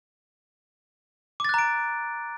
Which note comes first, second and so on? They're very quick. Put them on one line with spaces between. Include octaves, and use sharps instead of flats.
D6 A6 F#6 A#5 D7